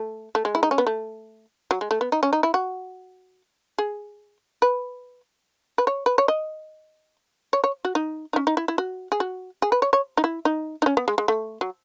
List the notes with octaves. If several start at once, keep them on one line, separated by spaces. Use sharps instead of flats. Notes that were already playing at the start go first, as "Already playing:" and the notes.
Already playing: A3
A3
G#3
E4
D#4
C#4
B3
A3
F#3
G#3
A3
B3
D#4
C#4
D#4
E4
F#4
G#4
B4
B4
C#5
B4
C#5
D#5
C#5
C#5
F#4
D#4
D#4
C#4
D#4
E4
E4
F#4
G#4
F#4
G#4
B4
C#5
C#5
D#4
E4
D#4
D#4
C#4
B3
G#3
G#3
A3
F#3